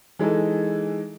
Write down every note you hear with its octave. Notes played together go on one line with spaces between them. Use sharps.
E3 G#3 D#4 A4